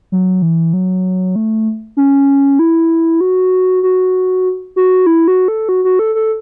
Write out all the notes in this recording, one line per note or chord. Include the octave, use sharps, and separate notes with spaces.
F#3
E3
F#3
A3
C#4
E4
F#4
F#4
F#4
E4
F#4
A4
F#4
F#4
A4
A4